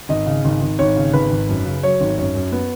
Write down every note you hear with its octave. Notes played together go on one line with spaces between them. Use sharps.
G#1 D#5
C#3
G#1
G#1
G#1 C#5
C#3
G#1 B4
G#1
F#2
C#3
F#3 C#5
G#1
F#2 C#5
F#2
B3